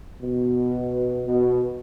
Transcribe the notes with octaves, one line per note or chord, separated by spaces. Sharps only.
B2
B2